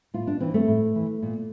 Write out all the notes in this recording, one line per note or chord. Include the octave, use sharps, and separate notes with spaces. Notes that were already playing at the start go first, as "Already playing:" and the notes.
A2 F4
D4
E3 C4
A3
A2
E3
A#2